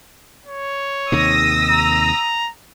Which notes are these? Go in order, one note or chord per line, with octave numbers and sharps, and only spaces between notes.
C#5
D#2 C3 D#3 D#6 E6 A#6
A#5